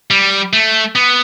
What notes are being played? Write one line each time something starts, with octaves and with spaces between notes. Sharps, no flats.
G3
A3
B3